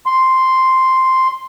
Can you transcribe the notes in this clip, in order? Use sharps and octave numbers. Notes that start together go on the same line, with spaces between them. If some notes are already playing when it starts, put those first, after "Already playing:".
C6